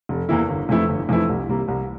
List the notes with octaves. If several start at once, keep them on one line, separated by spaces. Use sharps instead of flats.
F1
E2 E3 A#3 E4
G1
F2 E3 A3 E4
G1
F2 E3 A3 E4
C2
C3 G3 A#3
C2